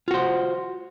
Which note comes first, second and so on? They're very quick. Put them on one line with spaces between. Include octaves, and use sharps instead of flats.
F4 F#4 C5